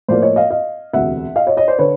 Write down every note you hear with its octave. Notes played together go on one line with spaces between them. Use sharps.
A2 F3 A#3 C5 D5
C#5 D#5
D#5 F5
D#5 F5
E1 D2 C3 E5 F#5
D#5 F5
C#5 D#5
C#5 D#5
C5 D5
D3 B4 C#5